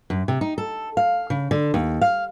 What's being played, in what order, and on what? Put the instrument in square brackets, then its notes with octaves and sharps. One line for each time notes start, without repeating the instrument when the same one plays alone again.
[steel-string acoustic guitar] F#2
C3
D#4
A4
F5
C#3
D3
D#2
F5